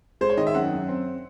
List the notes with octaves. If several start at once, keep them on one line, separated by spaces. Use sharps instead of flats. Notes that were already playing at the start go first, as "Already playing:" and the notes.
G#3 C5
C#5
D#3 D#5
E5
F#2 F#5
F#2
C4